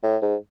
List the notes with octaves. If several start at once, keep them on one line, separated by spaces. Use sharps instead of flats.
A2
G#2